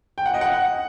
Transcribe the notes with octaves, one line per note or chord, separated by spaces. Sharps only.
G5
F#5
D#5
F#5